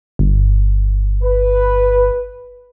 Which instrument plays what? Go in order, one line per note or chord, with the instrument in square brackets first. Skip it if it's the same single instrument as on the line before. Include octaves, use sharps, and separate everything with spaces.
[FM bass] G1
[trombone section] B4